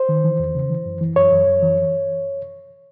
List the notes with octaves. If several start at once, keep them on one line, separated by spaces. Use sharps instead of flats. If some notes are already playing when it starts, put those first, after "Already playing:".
Already playing: C5
D#3
E3
E2
C#3
E3
F#2
E3
F#2 C#5
F#2
F#2
E3